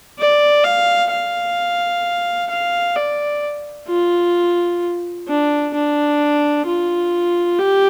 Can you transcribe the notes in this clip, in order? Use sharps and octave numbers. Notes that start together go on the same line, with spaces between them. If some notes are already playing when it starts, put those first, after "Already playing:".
D5
F5
F5
F5
D5
F4
D4
D4
F4
G4